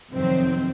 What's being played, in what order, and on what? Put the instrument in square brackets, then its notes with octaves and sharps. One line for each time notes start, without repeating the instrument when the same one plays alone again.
[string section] F2 C3 D#3 F#3 C4